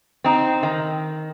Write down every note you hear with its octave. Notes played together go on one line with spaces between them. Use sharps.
C4 D#4
D#3